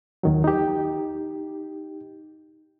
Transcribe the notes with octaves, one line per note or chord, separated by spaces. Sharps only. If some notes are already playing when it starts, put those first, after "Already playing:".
D#2 D#3 F#3
D#4 G4